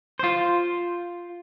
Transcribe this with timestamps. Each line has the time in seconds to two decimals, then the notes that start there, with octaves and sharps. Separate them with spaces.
0.19 F4 C5